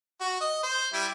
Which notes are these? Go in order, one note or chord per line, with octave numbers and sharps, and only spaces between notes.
F#4
D#5
C5
G3 E4